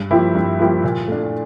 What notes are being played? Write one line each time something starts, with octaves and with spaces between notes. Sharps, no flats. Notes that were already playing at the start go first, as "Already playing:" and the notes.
Already playing: G2
F3 A#3 E4 G4
G2
F3 A#3 E4 G4
A#2
A3 D4